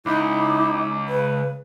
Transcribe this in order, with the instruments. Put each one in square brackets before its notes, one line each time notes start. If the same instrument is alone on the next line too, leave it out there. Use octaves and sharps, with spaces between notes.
[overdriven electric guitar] C#2 [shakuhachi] D#4 [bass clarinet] E4 [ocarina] D6
[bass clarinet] C#3 [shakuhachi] B4